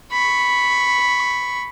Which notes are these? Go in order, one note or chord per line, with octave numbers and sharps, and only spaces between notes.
B5 C#6